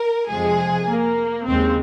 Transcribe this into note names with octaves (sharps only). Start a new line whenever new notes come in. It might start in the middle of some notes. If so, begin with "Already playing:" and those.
Already playing: A#4
F2 C3 F3 G#3 G#4
A#3
D#2 C#3 G#3 C4